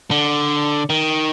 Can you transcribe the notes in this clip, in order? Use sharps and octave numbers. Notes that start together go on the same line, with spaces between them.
D3
D#3